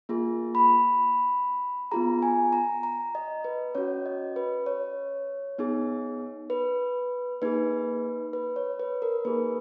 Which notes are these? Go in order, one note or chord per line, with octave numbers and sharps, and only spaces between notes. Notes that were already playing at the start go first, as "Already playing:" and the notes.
A#3 F4 G#4
B5
B3 F4 G#4 A#5
G#5
A#5
A#5
D#5
B4
C#4 F#4 C#5
D#5
B4
C#5
B3 D#4 G#4
B4
A#3 D#4 G#4 B4
B4
C#5
B4
A#4
A#3 D#4 G#4 B4